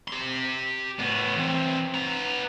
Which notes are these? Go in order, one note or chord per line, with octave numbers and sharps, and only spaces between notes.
G4 C6
A2 B3
E3 C4
B3 A#5